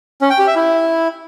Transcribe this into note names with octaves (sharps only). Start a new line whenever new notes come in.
C#4
G5
G4
E5
E4